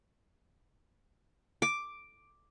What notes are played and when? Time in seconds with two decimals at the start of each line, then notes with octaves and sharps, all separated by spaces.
1.62 D6